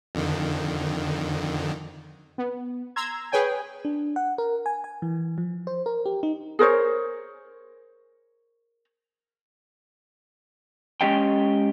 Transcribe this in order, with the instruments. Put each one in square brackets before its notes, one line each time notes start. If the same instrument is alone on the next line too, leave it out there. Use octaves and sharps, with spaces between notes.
[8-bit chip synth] F2 D3 D#3
[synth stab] B3
A#5 C6 E6 G#6
G#4 B4 C#5 G5 G#5
[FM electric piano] D4
F#5
A#4
G#5
G#5
E3
F3
C5
A#4
G4
D#4
[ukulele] G#4 A#4 C5 C#5
[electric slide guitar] G#3 C#4 G4 D#5 G5